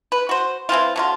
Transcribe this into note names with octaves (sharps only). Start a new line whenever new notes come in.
B4
F#4 C5
E3 C4 E4 F4
D3 F#3 F4